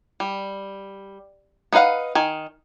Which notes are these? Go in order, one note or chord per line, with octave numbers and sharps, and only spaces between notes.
G3
B3 D#4 B4 F5 F#5
D#3 G#5